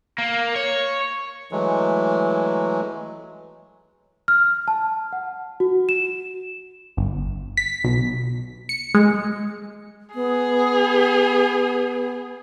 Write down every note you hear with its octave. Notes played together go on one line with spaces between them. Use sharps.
A#3
C#5
E3 F#3 G#3 A3
F6
A5
F#5
F#4
E7
G1
B6
B1
C#7
G#3
B3 G#4